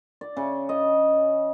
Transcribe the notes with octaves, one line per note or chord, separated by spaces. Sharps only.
D5
C#3
D#5